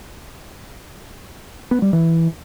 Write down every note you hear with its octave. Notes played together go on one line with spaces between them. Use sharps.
B3
G3
E3